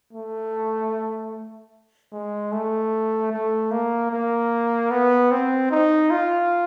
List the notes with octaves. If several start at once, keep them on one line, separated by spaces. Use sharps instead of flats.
A3
G#3
A3
A3
A#3
A#3
B3
C4
D#4
F4